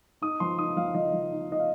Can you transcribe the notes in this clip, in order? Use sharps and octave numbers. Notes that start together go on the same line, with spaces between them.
D#4 D#6
F3 C6
D#4 D#6
F3 F5
F3 D#5
F3
D#4
D#4 D#5
F5